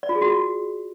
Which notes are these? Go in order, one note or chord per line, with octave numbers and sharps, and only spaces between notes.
D5
F4
G#4
F#4
F4